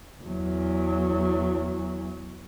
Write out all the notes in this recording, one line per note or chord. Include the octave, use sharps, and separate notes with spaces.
E2 F#3